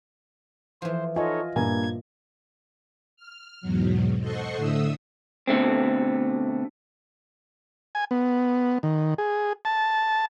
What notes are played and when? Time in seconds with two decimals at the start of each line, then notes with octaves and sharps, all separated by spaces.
0.82 E3 F3 C5
1.16 D#4 F4 A4 C#5 D#5 G#5
1.56 G2 A#2 A#3 G#5 G#6
3.16 F6
3.61 E2 G#2 B2 F#3
4.20 A4 C5 D#5 F#5 C6 C#6
4.56 A2 D3 E5 D#6 E6
5.47 B2 D3 A3 C4
7.95 G#5
8.11 B3
8.83 D#3
9.18 G#4
9.65 A5